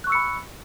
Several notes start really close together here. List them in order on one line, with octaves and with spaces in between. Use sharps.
F#6 C#6 E6 C#7 B5